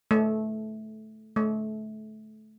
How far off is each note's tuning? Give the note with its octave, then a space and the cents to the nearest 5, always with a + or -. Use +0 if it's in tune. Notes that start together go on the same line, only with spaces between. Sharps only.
A3 -15
A3 -25